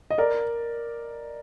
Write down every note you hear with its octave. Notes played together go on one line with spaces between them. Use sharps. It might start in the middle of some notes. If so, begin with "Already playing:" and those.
D#5
A#4 D5